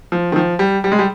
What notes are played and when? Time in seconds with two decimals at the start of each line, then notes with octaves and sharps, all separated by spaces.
0.12 F3
0.32 D#3
0.36 F3
0.59 G3
0.84 G3
0.92 G#3
0.99 G3